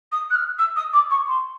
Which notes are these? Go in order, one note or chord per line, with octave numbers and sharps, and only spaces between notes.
D#6
F#6
F6
E6
D#6
D6
C#6
C6